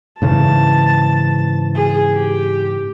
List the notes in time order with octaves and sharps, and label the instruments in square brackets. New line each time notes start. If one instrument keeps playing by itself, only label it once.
[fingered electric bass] G#2 C#3 E3 [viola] A5
[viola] G#4
G4